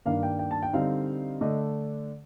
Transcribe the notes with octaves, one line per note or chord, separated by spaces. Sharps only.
G2 D#3 A#3 D4 F5
G5
G5
A5
G5
D3 G3 C4 D#4 F5
D3 A3 D4 D#5